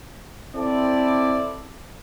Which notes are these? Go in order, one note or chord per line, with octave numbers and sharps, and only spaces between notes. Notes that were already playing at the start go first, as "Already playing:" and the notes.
C4 E4 A4 D5